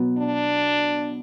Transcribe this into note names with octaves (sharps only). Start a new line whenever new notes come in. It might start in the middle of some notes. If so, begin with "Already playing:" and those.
Already playing: B2 F#3 B3
D4